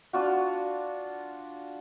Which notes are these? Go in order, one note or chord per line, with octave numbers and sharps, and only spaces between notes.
D4 F4 F#4